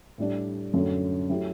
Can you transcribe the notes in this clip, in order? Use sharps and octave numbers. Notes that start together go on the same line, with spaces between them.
A2 G3 D4
F#2 D3 F#3 A3
F#3 A3 E4 G4